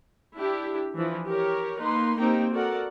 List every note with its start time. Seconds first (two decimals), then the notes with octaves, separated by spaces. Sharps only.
0.36 D4 E4 G4
0.97 E3 F3
1.25 G4 A#4 C#5
1.80 A#3 D#4 B4 C6
2.18 A#3 C4 D#4 G4 G5
2.51 F#4 A4 A#4 D5 F#5